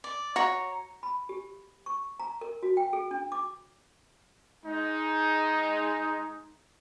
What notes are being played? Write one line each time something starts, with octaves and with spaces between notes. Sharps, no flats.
D5
F#4 C#5 A#5
B5
G4
C#6
A#5
A#4
F#4
G5
G#4
D4
D6
G#3 D#4